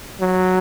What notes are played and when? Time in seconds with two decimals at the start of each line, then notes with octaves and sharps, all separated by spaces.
0.20 F#3